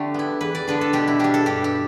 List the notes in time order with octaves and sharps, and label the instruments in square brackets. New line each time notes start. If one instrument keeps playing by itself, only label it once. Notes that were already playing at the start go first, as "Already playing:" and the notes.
Already playing: [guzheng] D3 A3 D4 G4 D5
B3 E4
E2 B4
D5
D3 B3 D4 B4
A4
B2 G4
E4
G3 D4 G4
A4
G2 G4
G4